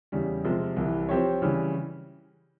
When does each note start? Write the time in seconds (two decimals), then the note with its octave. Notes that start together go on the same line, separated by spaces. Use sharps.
0.12 E2 C#3 G3
0.44 C3 F3 G#3
0.76 C2 C3 E3
1.09 F3 C4 G4 C#5
1.42 C#3 E3 G3